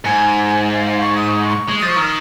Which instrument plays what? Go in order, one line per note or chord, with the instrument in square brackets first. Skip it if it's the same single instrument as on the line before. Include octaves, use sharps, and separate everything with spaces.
[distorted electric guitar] G#2 [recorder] G#5
[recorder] G#5
G#5
F5
F5
C#6
D#6
C#6
C#6
[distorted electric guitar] G#3
[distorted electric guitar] F3 [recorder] D#6
[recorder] C#6
[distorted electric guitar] D#3 [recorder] F6
[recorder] D#6